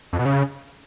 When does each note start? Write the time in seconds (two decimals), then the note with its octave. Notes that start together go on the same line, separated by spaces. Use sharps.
0.13 F2
0.19 B2
0.25 C#3